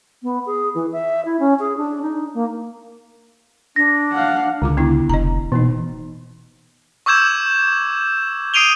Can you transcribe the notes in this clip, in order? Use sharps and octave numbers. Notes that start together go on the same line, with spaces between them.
B3
G#4
E3
E5
E4
C#4
G#4
D4
D#4
A#3
D4 A#6
F5 F#5
C#2 D3 F4 D6
B3 D4 E4
F1 D#5 A#5
B2 E3 A#3 D#4
C#6 D6 E6 G6 G#6 E7
D#6 C7 D7 D#7 F7 G7